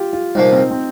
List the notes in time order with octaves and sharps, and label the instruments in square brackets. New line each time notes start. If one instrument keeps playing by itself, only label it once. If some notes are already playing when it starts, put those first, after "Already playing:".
Already playing: [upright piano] F4 G4
F4
[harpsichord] C2 A#2 F3 A#3 [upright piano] D#4
[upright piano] C4
C4